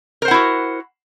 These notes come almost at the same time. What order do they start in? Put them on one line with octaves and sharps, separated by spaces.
A#4 C5 F#5 E4 F#4